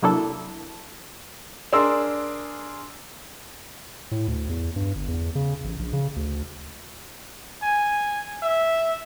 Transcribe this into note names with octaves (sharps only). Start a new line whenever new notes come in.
C3 F#3 A#3 D4 E4 A4
D4 G#4 A#4 C6 E6
A2
D2
E2
G2
G1
E2
C#3
A1
A#1
C#3
D2
G#5
E5